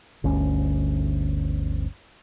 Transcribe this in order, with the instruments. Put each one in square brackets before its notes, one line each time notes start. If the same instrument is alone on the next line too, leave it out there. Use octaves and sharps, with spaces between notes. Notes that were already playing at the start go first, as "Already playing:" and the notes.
[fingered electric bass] G1 D2 C#4